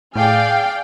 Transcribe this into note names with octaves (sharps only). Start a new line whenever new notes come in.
A2 G#4 D5 F5 G5